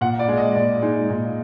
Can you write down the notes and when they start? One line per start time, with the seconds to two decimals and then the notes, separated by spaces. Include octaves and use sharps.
0.01 A#2 F#5
0.19 D5
0.28 G#3
0.37 D#5
0.55 A#2 D5
0.82 G#3 D#4
1.10 A#2